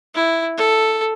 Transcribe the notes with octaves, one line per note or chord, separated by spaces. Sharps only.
E4
A4